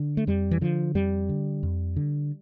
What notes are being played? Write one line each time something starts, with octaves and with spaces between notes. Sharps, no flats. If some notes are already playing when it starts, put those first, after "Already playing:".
Already playing: D3
A3
F2 G3
E3
D3 F3
F2 G3
D3
F2
D3